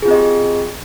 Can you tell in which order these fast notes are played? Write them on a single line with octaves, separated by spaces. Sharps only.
G#4 F4 C4 D#5 G4